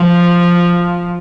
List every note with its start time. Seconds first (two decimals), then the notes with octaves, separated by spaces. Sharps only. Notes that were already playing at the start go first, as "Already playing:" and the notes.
Already playing: F3